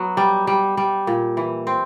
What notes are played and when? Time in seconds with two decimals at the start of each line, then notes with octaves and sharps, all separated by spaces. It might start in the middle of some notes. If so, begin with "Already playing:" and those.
Already playing: F#3 B3
0.17 G3
0.47 G3
0.77 G3
1.07 A#2
1.37 E3
1.67 C4